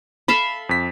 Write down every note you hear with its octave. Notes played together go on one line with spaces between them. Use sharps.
A4 E5 F5 B5
F2 B6